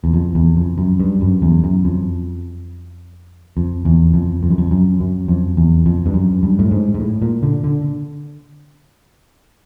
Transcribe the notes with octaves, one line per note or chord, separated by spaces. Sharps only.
E2
F2
E2
F2
F#2
G2
F#2
E2
F#2
F2
F2
E2
F2
F2
F#2
F2
F#2
F#2
F2
E2
F2
G2
F#2
G2
A2
G#2
G#2
A2
A#2
D3
D3